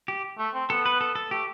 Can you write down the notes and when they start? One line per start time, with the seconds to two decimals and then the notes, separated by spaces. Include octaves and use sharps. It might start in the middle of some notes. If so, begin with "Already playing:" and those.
0.08 G4
0.38 A3
0.54 C4
0.70 B3 A4
0.86 B4
1.01 A4
1.15 A4
1.31 A3 G4